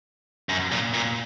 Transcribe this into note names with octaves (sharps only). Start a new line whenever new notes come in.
F#2
A#2
A#2